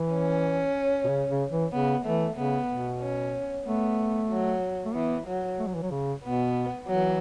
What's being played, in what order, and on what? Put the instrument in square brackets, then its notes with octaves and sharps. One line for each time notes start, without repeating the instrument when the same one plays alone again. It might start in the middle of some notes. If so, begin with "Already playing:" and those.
Already playing: [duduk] E3
[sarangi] C#4
[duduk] B2
C#3
C#3
E3
[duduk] C#3 [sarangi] B3
[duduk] E3 [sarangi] A3
[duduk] C#3 [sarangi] B3
[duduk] B2
[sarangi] C#4
[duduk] A3 [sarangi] B3
[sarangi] F#3
[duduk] A3
[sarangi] E3 [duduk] B3
[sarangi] F#3
[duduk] A3
F#3
E3
F#3
C#3
[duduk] B2 [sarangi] B3
[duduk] E3 [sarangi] F#3